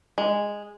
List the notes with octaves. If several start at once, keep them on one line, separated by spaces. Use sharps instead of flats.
G#3